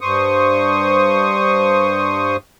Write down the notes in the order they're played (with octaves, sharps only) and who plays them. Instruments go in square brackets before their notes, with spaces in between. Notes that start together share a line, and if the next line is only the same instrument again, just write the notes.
[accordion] G2 C5 C#6 D#6